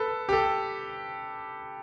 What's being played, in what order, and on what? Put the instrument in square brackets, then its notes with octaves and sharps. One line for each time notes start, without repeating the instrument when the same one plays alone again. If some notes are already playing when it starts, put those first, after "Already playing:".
Already playing: [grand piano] A4 B4
G4
A4